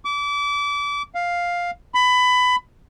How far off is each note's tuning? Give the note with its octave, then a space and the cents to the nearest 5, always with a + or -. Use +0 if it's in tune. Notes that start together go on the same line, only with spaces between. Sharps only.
D6 -30
F5 +5
B5 +20